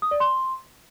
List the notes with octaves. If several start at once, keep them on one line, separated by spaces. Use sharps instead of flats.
D#6
D5
C6